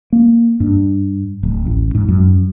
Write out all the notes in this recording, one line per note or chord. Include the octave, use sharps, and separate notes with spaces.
A#3
G2
D1
A1
G#2
F#2